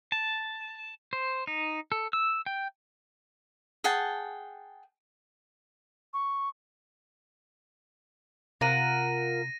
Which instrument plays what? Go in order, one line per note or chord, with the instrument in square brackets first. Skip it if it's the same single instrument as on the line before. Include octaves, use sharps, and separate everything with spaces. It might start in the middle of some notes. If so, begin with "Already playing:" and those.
[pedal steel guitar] A5
C5
D#4
A4
E6
G5
[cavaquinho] G#4 F#5 G5 A5
[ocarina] C#6
[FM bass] C3 [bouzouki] F4 A#4 F#5 [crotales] A#6 D#7